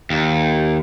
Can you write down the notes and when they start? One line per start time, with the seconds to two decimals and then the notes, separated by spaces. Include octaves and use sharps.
0.10 D#2